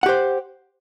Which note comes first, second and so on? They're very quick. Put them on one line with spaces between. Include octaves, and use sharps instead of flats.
F#5 G4 C5